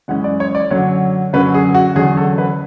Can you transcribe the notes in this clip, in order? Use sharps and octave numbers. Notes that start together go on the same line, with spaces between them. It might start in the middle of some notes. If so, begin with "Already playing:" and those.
F#2 E3 G#3 C#4 F#5
D5
C#5
D5
F#2 D3 F#3 C#4 C#5
F#2 D3 F#3 C#4 B4
G#4
F#4
E2 D3 F#3 C#4 G#4
A4
B4